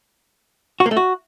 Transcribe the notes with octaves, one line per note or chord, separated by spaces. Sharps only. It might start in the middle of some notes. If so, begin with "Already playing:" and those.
F#4
A#3
A3
F#4